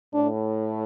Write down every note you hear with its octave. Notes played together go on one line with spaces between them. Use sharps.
A2 D4